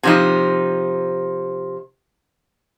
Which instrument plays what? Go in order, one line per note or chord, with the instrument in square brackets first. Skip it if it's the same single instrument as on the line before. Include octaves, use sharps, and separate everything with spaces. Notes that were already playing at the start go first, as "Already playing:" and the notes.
[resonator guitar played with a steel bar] C3 F3 D#4